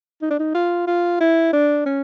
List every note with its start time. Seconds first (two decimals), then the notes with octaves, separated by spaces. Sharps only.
0.22 D#4
0.31 D4
0.39 D#4
0.54 F4
0.87 F4
1.20 E4
1.53 D4
1.86 C#4